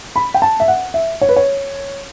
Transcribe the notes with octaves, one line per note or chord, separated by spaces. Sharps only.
B5
G5
A5
E5
F#5
E5
C#5
B4
C#5